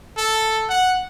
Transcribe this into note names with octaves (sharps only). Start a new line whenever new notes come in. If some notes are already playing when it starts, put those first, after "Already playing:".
A4
F#5